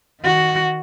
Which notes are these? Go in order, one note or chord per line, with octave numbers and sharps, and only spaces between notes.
D#3 F#4